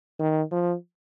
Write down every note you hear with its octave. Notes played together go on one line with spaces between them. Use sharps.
D#3
F3